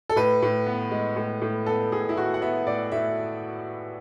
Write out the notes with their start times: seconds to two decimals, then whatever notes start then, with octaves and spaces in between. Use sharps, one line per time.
0.09 A4
0.16 A2 B4
0.42 A2
0.66 B3
0.91 G#3
1.16 A2
1.42 A2
1.66 B3 A4
1.92 A2 G#4
2.09 E4
2.16 A2 F#4
2.34 F#5
2.41 B3 E5
2.66 A2 D5
2.92 A2 E5